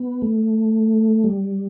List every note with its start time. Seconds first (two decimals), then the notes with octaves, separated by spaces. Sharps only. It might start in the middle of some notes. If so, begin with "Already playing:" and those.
Already playing: B3
0.22 A3
1.24 G3